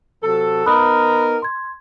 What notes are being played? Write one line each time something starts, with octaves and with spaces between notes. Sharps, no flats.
C3 F#3 A4
B3 D#4 A#4 B5 D#6 F#6
C6 G#6